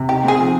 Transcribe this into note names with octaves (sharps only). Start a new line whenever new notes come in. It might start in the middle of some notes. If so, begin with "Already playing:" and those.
Already playing: C3
D#4 G4
C4 G#4
F3